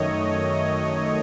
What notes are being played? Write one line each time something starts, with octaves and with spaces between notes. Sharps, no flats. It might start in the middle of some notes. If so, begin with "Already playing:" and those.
Already playing: F#2 D#3 A3 C#5 D#5
D#5